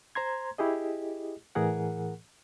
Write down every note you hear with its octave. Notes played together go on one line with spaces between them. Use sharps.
C5 A#5 C6 G#6
E4 G4 G#4 D#5
A2 E3 G#4 A#4 F#5